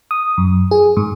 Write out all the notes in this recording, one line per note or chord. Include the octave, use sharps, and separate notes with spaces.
D#6
F#2
G#4
G#2